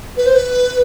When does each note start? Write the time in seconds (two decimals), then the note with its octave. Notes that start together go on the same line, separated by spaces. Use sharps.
0.17 B4
0.26 C5
0.35 B4